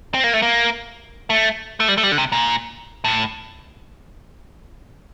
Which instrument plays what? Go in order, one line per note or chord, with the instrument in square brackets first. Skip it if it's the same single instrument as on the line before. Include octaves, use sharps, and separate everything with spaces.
[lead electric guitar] C4
A#3
A3
A#3
A3
A3
G3
A3
G3
D3
C3
A#2
A2